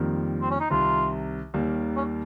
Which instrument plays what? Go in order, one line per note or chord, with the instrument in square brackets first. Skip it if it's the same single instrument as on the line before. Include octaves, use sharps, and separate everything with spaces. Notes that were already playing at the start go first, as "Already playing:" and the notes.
Already playing: [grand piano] F2 D#3 G3 A#3 F4
[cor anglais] C4
C#4
D#4
[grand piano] C2 C3 D#3 [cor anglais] F4
[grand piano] D#2 D#3 G3 A#3
[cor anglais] C#4